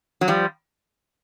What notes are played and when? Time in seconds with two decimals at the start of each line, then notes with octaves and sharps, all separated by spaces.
0.21 F#3
0.28 F3 G3